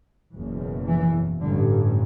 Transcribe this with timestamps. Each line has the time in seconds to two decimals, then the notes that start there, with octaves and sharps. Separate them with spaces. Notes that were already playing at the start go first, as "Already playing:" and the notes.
0.35 F#1 E2 B2
0.87 E3
1.40 A1 G2 D3